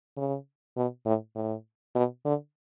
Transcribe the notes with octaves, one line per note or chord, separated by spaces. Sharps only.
C#3
B2
A2
A2
B2
D3